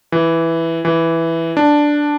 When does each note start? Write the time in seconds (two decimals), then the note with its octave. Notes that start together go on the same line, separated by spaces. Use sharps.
0.12 E3
0.85 E3
1.57 D4